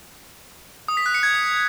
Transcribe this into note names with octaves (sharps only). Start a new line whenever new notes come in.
D#6
B6
F#6
C#7
G#6